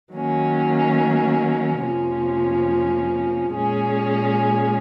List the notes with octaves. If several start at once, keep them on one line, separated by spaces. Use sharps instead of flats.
D#3 F#3 A#3 C#4
F2 C3 F3 A#3 C#4
A#2 G#3 C#4 G#4